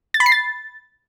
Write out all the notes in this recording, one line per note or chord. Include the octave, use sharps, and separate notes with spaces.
A6
B5
C7
A6